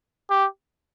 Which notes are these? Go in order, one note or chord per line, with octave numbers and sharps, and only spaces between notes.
G4